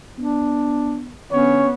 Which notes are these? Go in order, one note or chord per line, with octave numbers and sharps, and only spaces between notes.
B3 D4
D3 B3 C#4 C#5